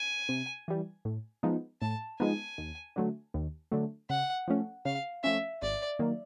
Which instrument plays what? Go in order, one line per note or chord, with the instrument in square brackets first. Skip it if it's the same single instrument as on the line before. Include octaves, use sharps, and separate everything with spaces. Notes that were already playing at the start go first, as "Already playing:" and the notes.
Already playing: [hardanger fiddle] G#5
[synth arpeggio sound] C3
E3 G3
A2
F3 G#3 B3 D#4
[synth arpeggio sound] A2 [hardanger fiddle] A5
[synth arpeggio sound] F3 G#3 B3 D#4 [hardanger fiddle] G#5
[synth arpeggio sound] D#2
D3 F#3 A3
D#2
D3 F#3 A3
[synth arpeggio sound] C#3 [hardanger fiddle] F#5
[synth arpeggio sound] F3 A3 C#4
[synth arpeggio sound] C#3 [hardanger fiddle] F5
[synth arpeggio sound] F3 A3 C#4 [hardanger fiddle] E5
[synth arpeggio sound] G#1 [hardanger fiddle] D5
[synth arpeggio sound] D#3 F#3 A#3